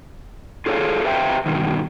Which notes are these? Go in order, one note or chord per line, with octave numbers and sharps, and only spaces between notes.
F4 G#4 A4 C#5 D5 F5
G4 B4 C5 E5 F5 G5
G2 B2 D#3